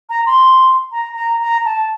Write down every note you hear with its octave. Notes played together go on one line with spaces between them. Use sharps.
A#5
C6
A#5
A#5
A#5
A5